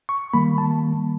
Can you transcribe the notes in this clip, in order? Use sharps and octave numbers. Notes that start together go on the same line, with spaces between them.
C#6
D#3 G3 A#3 B5
A5